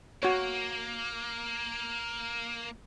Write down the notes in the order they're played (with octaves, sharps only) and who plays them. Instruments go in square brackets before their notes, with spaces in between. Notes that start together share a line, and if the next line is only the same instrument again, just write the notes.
[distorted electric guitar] A#3 [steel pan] F#4 C#5